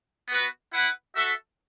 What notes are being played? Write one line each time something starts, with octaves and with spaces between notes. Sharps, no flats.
B3 F#4 B4
E4 B4 F#5
F#4 A4 E5